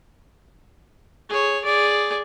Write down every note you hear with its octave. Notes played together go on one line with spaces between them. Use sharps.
G#4 C#5
G#4 D5